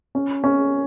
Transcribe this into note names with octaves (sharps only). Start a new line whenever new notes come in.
C#4
C#4